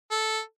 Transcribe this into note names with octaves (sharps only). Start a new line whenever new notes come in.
A4